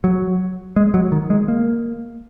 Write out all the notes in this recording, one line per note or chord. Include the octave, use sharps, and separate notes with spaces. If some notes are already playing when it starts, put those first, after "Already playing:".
F#3
G#3
F#3
D#3
G#3
A#3